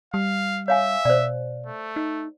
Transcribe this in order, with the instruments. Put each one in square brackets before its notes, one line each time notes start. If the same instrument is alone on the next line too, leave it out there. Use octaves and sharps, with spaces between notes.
[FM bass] G3 [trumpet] F5
[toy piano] C#5 F5 G#5 [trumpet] E5
[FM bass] B2 [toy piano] C5 D5
[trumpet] A3
[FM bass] D#4